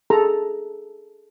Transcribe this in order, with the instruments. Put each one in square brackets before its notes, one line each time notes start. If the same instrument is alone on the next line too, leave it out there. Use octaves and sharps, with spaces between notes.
[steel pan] G#4 A4 A#5